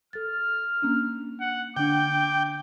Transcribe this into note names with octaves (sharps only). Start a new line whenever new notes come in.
A4 F6 A6
A#3 C#4 D4
F#5
D3 D4 G5 D6